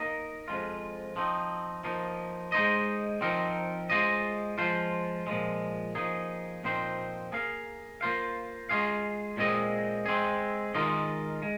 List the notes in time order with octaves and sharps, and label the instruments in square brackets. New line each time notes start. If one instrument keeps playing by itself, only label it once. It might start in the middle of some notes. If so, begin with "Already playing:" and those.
Already playing: [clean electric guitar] A#3 D#4 A#4 D#5
F2 F3 G#3 F4
F3 C4 D#4
F3 A#3 D#4
G#3 D#4 C5 D#5
F3 C4 D#4 A#4
G#3 F4 C5 D#5
F3 G#3 F4 C5
A#2 F3 G#3
F3 A#3 D#4 G#4
A#2 F3 C4 D#4 C5
A#3 G#4 F5
A#3 F4 C5 F5
G#3 F4 G#4 F5
A#2 G#3 C4 G#4 D#5
G#3 C4 G#4
D#3 G#3 F4 A#4 D#5
G#3